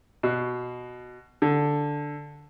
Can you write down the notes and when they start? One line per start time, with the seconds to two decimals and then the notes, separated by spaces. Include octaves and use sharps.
0.23 B2
1.42 D3